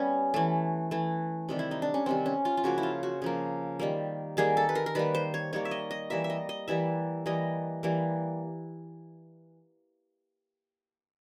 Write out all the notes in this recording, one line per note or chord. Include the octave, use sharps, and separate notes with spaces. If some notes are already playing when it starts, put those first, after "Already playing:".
Already playing: G3 B3 C#4
E3 A3
E3 A3
C3 D#3 G3
E4
D#4
D4
C#4
C3 D#3 G3 C4
C#4
F4
F4
C#3 F3 A#3 F#4
E4
F4
F#4
C#3 F3 A#3
D#3 G3 A#3
D#3 G3 A#3 G#4
A4
B4
A#4
A#4
D#3 G3 A#3 B4
C5
C#5
D#3 G3 A#3 C#5
E5
D#5
D#5
E3 G3 A#3 E5
E5
D#5
D#5
E3 G3 A#3 E5
E3 G3 A#3 D#5
E3 G3 A#3